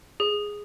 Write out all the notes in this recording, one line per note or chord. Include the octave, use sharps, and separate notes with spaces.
G#4